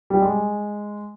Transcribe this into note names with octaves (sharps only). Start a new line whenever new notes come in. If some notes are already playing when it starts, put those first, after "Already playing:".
G3
G#3